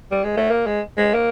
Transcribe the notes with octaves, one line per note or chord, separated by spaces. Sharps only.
G3
G#3
A3
A#3
G#3
G#3
A#3